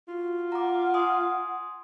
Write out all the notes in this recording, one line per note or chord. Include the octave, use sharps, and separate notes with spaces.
F4 F#4
F#5 A#5 D6
G#5 C6 D#6